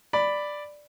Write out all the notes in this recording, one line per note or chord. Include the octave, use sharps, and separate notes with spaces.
D5 B5